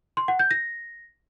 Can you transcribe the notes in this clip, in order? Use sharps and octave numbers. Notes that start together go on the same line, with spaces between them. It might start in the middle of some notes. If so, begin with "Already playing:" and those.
C6
F#5
G6
A#6